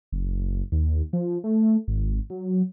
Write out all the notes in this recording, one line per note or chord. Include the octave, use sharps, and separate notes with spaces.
F#1
D#2
F3
A3
G#1
F#3